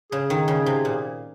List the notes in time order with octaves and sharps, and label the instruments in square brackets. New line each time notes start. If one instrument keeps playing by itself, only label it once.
[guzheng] C#3 [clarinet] G#4
[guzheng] D#3
C#3
C3
A#2